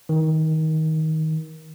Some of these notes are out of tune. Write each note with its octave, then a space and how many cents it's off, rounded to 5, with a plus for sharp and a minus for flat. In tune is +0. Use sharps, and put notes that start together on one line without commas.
D#3 +20